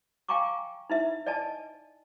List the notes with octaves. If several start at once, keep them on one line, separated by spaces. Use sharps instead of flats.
F5 G5 G#5 A#5 C#6 D6
D#4 E4 E5
D5 D#5 G#5 A5